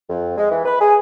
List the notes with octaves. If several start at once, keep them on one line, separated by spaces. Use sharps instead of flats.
F2
G#3
E3
B4
G#4